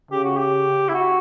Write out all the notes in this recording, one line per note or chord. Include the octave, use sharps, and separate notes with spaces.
C#3 G4
F#4
G4
E4
F#4